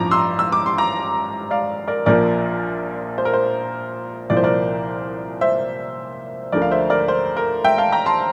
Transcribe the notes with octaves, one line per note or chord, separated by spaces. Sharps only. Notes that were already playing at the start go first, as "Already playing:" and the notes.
Already playing: A1 G2 F3 A#5 D6
C6 E6
E6
D6
C6
A#5 D6
D5 F5
A#4 D5
A#1 A#2 F3 A#4 D5
C5
A#4
C5
C2 A#2 F3 D5
C5
A#4 D5
C5 E5
D2 D3 F3 A#4 D5
F5
C5 E5
A#4 D5
C5
A#4
E5 G5
F5 A5
G5 A#5
A5 C6